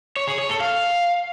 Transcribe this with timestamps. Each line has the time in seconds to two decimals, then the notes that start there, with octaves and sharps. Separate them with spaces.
0.16 C#5
0.27 G#4
0.38 C#5
0.49 A4
0.60 F5